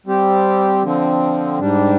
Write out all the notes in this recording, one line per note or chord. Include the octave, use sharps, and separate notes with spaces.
G3 C4 G4
D3 F3 C4
G#2 G3 D4